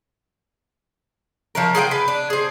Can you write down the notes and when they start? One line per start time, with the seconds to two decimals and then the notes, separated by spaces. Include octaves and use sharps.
1.55 F3 F#3 A#4
1.75 G#4 C5 F#5 G5
1.91 B4
2.08 D4
2.30 G#4 C5